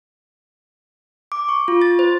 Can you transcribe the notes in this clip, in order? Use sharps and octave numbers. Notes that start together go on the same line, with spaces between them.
D6
C#6
F4
A6
C5